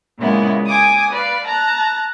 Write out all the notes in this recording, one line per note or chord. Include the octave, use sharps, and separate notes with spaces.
A#2 C#3 G#3 A#3 B3 E4
G#5 D6 D#6
B4 D5 F5
A5 A#5 F#6